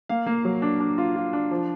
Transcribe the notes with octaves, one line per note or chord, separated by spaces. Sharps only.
A#3 F5
A#3
F#3
D4
D4
F4
F4
D4
F3